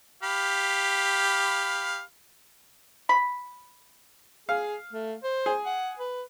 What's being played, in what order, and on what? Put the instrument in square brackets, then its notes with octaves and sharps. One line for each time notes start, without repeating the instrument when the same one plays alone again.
[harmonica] G4 F5 B5
[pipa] B5
[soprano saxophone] G#4 [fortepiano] F5
[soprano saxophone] A3
C5
[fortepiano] G#4
[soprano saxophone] F#5
B4